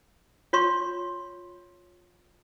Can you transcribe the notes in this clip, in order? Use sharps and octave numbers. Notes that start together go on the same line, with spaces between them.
F4 C#5 C6 C#6